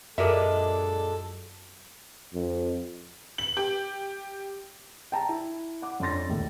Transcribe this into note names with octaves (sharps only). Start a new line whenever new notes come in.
F#2 A#2 G#3 D4 G4 A4 A#4 E5
F2
F#7
G4
G5 A5 A#5
E4
F#5 D6
F2 C#4 D4 C6 A6 A#6
A#1 D#2 A2